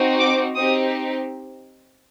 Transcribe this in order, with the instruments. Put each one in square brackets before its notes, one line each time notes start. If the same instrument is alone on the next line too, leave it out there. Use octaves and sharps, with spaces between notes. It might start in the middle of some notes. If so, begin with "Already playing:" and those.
Already playing: [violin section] C4 D#4 F#4
D6
C4 D#4 G4 D#6